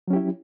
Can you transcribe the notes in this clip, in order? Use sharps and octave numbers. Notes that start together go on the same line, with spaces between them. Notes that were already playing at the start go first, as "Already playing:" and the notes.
F#3 C#4 E4 G4